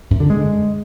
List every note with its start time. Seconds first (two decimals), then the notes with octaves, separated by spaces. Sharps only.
0.11 F#2
0.20 D3
0.30 G#3